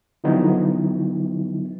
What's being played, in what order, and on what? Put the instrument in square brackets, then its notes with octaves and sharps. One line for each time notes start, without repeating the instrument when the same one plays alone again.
[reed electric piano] D3 F3 F#3 B3 D#4 E4